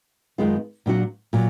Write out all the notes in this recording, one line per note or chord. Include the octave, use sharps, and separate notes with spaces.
F#2 D#3 G#3 B3 F4
A#2 F#3 D4 F#4
A#2 F#3